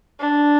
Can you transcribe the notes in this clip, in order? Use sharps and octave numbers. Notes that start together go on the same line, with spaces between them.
D4